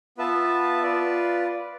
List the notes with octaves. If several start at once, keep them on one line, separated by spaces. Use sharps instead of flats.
B3 F4 B4 E5 A5
F4 B4 D5